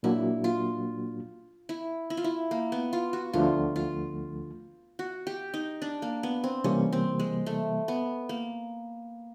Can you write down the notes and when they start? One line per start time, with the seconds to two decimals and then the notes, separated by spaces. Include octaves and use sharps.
0.03 A#2 F#3 A#3 D4 E4 F#4
0.44 F4
1.69 E4
2.10 E4
2.17 F4
2.24 E4
2.51 A#3
2.72 B3
2.93 F4
3.13 F#4
3.33 D2 D3 F3 A3 F4
3.76 F4
4.99 F#4
5.27 G4
5.54 D#4
5.82 D4
6.02 A#3
6.23 B3
6.44 C4
6.64 C3 E3 G3 A#3 C#4
6.93 C4
7.19 G#3
7.46 A3
7.88 B3
8.29 A#3